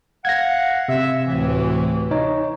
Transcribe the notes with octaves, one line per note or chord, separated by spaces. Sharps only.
F5 F#5 G#6 A#6
C3 E5
D2 A2 E3
D#4 C#5